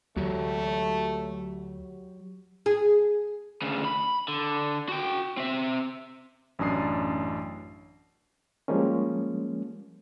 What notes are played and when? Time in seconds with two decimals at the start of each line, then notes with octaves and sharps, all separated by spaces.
0.17 D2 F#3 A3 F#4 G4
2.66 G#4
3.62 D2 C#3
3.85 B5
4.28 D3
4.89 F#4 G5
5.37 C4 E5
6.59 A1 F#2 D4 D#6 C7
8.68 F3 G3 G#3 A#3 C#4